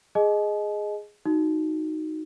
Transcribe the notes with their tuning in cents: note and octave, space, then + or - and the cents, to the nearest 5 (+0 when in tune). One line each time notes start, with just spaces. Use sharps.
G#4 +0 D#5 +0 G#5 +45
D#4 +0 F#4 +0